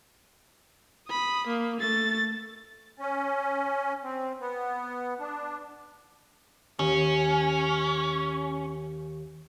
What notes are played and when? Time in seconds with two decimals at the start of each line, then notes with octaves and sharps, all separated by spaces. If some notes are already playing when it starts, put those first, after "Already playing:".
1.07 B5 D#6
1.47 A#3
1.81 A3 A6
2.99 C#4
4.03 C4
4.40 B3
5.20 D4
6.79 D#2 C#4